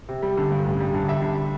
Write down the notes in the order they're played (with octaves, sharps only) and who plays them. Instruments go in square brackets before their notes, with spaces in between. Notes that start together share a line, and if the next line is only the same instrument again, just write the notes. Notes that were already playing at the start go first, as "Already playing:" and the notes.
[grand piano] C3
G3
D3
G2
A1
G3
D3
G3 E5
D3